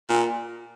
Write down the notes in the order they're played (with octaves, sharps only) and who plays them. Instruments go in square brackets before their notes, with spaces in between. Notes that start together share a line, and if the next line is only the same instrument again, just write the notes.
[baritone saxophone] A#2